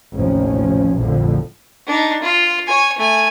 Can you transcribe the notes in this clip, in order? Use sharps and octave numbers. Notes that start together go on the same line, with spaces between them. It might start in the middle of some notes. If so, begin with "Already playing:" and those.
A1 D#2 C3 F3 C#4
A#1 F2 A2 D3 F3
D4 D#4
F4
C#5 G#5
A3 G#5